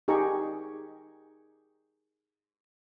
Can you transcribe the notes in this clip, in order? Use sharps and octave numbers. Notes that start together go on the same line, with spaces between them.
D#4 G4 G#4 A#5 C#6